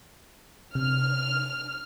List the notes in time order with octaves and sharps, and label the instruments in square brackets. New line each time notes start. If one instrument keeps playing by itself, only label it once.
[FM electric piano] C3 [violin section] F6